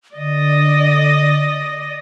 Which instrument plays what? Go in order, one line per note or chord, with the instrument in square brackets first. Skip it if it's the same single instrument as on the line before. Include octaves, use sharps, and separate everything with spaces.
[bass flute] D3 [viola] D5 D#5